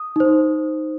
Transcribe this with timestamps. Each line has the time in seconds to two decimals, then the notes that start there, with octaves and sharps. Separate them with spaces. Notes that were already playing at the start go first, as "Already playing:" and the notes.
Already playing: D#6
0.16 D#4 C5